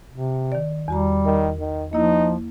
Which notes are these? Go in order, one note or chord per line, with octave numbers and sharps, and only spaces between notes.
C3
D#3 D5
E2 G3 F#4 A#5
D#3 A#4
D#3
F3 A#3 D#4 E4